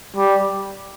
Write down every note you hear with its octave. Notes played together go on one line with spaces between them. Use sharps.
G3